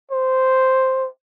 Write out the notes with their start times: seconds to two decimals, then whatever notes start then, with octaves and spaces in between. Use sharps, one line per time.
0.11 C5